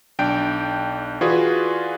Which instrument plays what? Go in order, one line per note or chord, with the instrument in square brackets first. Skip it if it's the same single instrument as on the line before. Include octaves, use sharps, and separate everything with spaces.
[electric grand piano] B1 D4 G5 G6 D7
E3 F4 F#4 G#4 B4 D5